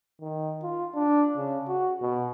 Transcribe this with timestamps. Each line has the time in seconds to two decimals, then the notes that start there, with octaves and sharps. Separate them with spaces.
0.21 D#3
0.63 F4
0.94 D4
1.37 C#3
1.68 F#4
2.02 B2